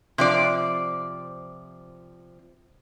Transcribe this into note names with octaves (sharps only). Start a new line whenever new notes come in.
C3 F3 D5